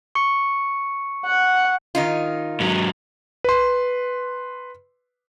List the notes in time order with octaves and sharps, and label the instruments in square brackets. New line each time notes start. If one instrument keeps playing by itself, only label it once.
[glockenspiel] C#6 C#7
[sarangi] F#5
[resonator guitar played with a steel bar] D#3 D#4 F4
[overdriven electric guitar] G#2 F#3
[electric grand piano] B4 C6